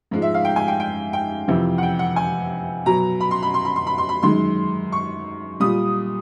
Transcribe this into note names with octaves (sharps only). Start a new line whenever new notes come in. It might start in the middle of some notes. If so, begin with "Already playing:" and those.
G#2 F3 G#3
E5
F5
G5
G#5
G5
G5
G5
F2 C3 E3
F#5
G5
F#5
G#5
B2 F#3 A#5
B5
C6
B5
C6
B5
C6
B5
C6
B5
F#2 D#3 G#3 C6
C#6
A#2 G3 D#6